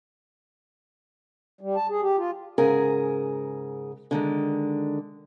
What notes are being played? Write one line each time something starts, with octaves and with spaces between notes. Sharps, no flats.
G3
A5
G#4
G4
F4
G#2 C#3 G#4 A#4 G#5
D3 D#3 G#3